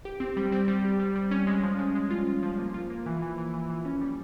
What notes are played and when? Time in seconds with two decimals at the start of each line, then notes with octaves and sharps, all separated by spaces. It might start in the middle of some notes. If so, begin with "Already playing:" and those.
0.05 G4
0.20 C4
0.37 G3
0.52 C4
0.68 G3
0.85 G4
0.99 G3
1.16 G3
1.31 C#4
1.47 G#3
1.63 F3
1.79 G#3
1.95 G#3
2.11 F4
2.27 F4
2.43 F3
2.58 A#3
2.74 F4
2.90 A#3
3.06 E3
3.22 E3
3.38 E3
3.54 E3
3.70 E3
3.85 C#4
4.01 G3